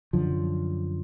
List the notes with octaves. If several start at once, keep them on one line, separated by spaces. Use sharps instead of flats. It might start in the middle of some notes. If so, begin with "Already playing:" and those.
F#2 D3 F3